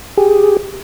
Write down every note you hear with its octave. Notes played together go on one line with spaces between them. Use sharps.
G4 G#4